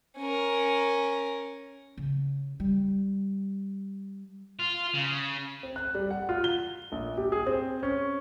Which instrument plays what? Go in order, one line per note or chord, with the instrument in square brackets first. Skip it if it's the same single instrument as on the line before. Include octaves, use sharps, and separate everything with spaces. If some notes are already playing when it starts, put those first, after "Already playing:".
[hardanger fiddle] C#4 A#4
[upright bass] C#3
G3
[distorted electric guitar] F4
C#3
[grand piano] C4
F#6
G3
F#5
F4
G7
A#1
G4
G#4
C4
C#4